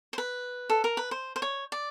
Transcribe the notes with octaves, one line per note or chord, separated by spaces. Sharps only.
C5
B4
A4
A#4
B4
C5
C5
C#5
D5